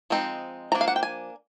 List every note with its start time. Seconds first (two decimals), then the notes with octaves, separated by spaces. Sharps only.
0.10 F3 G#3 C4 D#4
0.72 F3 A#5
0.75 A#3 D4
0.81 F5
0.88 F#5
0.96 G5
1.03 G#5